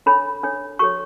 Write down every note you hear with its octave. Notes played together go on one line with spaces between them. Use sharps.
D4 A4 C#5 B5
D4 A4 C#5
F#4 A4 C#5 C#6